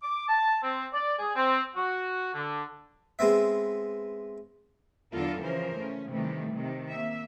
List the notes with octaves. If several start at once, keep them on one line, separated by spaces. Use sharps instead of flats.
D6
A5
C4
D5
G#4
C4
F#4
D3
G#3 B3 C4 E5
E2 D3 F#3 F4 A4 A#4
C#3 E3 F3 C#4 A#4 C5
A3 C#4
C3 D#3 E3 G3 A3
C3 D#3
A#3 E5